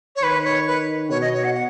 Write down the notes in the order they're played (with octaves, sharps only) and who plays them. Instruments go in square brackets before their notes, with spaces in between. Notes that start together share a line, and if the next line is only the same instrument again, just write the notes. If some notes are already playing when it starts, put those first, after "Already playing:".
[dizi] C#5
[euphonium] D#3 [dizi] B4
[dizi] C#5
B4
[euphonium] B2 [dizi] C#5
[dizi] D#5
C#5
F#5
F#5